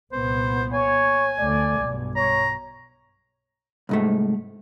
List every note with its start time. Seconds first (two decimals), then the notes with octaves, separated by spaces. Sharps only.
0.12 C2 A#2 B3 C5
0.73 C#5 G#5
1.39 D2 A3 D5
1.80 B1 G2 B2
2.17 C#5 A#5
3.89 C2 G#2 A3